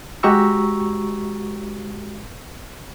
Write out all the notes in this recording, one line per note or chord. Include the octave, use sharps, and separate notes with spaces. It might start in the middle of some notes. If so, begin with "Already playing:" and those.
G#3 F#4 G4 A#5 C#6 E6